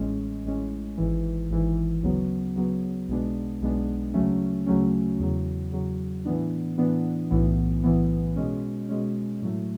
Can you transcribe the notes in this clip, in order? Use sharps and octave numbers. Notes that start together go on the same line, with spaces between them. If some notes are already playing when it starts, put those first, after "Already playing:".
Already playing: A1 A2 G#3 C#4
A1 A2 G#3 C#4
G#1 G#2 E3
G#1 G#2 E3
D2 C#3 F#3 B3
D2 C#3 F#3 B3
B1 B2 G#3 B3 D4
B1 B2 G#3 B3 D4
D2 C#3 F#3 A3 C#4
D2 C#3 F#3 A3 C#4
E2 C#3 F#3
E2 C#3 F#3
A2 E3 B3 D4
A2 E3 B3 D4
B1 A2 E3 B3
B1 A2 E3 B3
B2 G#3 C#4
B2 G#3 C#4
A2 F#3 A3